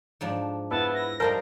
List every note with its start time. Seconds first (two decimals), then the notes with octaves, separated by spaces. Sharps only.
0.21 G#2 F3 D4
0.71 B3 E4 A5
0.94 A#6
1.20 F3 G3 D#4 A#4 C5 A5